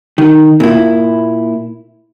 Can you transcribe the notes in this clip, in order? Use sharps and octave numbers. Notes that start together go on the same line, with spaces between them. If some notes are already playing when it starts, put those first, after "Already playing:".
D#3
A#2 E4